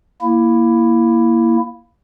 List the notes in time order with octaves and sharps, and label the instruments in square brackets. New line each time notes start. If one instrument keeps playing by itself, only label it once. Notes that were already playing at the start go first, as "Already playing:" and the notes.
[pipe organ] A#3 E4